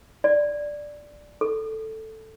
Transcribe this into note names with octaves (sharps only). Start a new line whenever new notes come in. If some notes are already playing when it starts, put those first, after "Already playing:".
D5
A4